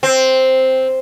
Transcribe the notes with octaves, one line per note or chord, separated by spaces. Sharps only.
C4